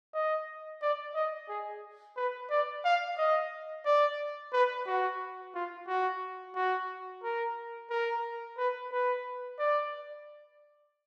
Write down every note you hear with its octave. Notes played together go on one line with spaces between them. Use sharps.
D#5
D5
D#5
G#4
B4
D5
F5
D#5
D5
B4
F#4
F4
F#4
F#4
A#4
A#4
B4
B4
D5